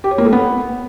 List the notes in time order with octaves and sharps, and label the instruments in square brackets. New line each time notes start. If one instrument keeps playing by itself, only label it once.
[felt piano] G4
C#5
A#3
A3
B3